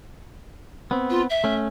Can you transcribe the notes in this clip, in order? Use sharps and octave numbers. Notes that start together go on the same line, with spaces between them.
B3 C4
F4
E5
A3 C#4